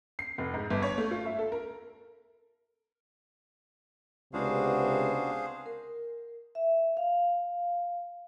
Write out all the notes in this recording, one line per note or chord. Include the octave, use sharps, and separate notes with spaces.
C7
F1
G#2
G1
C#5
A3
F4
E5
A4
A#4
C#2 C3 B3 D4 F#4 G#4 C5 F5
A#4
E5
F5